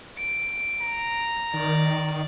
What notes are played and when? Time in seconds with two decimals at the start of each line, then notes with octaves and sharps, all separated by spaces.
0.18 D7
0.82 A#5
1.54 D#3 D5